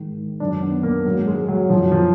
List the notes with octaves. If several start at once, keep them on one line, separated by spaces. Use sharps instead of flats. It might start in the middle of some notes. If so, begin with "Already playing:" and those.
Already playing: G#2 D#3
F#2 D#3 D4
B3
A#3
G#2 D#3 F#3
G#3
F#3
F#2 D#3 F3
F3